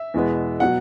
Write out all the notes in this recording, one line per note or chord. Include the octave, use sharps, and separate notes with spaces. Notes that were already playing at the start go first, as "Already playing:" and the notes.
Already playing: E5
E2 B2 G#3 B3
B2 F#3 F#5